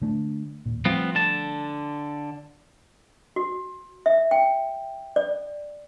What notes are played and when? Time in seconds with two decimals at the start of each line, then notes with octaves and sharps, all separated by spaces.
0.02 D3 A3
0.66 D#1 A#2
0.85 F3 G3 A3 B3 C4 F4
1.15 D3 A5
3.36 F#4
4.06 E5
4.31 G5
5.16 D5